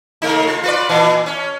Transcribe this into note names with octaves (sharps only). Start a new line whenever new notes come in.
C#3 A3 D#4
F4
F4 B4 D5
A#2 E3
C#4